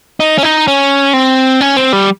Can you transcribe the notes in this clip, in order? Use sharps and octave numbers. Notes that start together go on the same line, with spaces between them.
D#4
C#4
D#4
C#4
C4
C#4
C4
G3